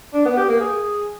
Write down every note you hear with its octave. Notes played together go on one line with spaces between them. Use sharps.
D4
B3
G4
A#3
G#4